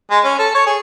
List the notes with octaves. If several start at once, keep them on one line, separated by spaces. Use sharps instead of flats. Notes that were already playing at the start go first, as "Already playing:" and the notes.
G#3
C#4
A4
C#5
G#4